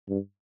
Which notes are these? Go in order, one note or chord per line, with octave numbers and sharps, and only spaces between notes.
G2